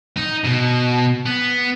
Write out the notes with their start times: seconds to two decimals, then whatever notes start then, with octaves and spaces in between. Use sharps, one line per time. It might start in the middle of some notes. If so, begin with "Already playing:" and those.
0.17 D#4
0.45 B2
1.26 B3